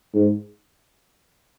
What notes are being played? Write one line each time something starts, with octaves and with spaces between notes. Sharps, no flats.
G#2